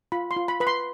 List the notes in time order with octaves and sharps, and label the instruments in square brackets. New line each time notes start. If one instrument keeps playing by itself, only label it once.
[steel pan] F4 B5
C6
F4
B5
B4 B5
C6